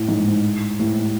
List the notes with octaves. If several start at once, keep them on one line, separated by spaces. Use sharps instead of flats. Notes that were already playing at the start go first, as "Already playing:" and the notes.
Already playing: A2
G#2
A2